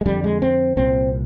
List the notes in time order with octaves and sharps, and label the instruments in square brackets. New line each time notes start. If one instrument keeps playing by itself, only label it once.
[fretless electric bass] G#3
F2 D3 G3
G#3
C4
C2 A#2 C4